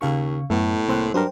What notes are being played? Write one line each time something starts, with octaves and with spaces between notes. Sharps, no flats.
D#2 C#3 F5 C#6
F#2 A2 A3 B3
C2 A#3 C4 C6 E6 F#6
G2 F#3 D4 A#4 C5 G5